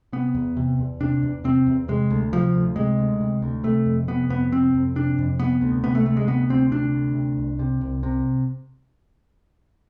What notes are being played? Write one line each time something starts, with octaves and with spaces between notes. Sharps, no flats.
C3 B3
E2
C3
E2
C3 D4
E2
C3 C4
E2
C3 G#3
D2
C3 F3
D2
C3 G#3
D2
C3
D2
C3 A3
F2
C3 B3
F2 B3
C3 C4
F2
C3 D4
F2
C3 B3
D2
C3 B3
A3
D2 A3
G#3
C3 B3
D2 C4
C3 D4
D2
C3
C2
C3
C2
C3